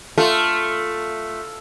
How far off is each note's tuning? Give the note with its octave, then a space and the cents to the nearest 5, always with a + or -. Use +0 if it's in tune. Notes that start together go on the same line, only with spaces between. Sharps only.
A3 +0 F4 +0 A4 +0